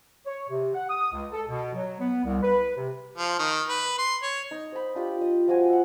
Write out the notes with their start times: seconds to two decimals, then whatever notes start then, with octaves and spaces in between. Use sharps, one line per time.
0.26 C#5
0.49 C3
0.74 F#5
0.90 D#6
1.12 C#2
1.32 A4
1.48 B2
1.74 F#3
2.00 B3
2.24 C2
2.43 B4
2.77 C3
3.18 F3
3.39 D#3
3.69 B4
3.99 C6
4.22 C#5
4.51 D#4
4.72 C5 B5
4.95 D4 F4 G4
5.21 D#5
5.48 F3 F#4 G#5
5.69 E5 F#5